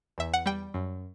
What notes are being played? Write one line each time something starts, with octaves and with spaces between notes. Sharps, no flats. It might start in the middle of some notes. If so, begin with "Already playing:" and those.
E2 E5
F#5
G3 G5
F#2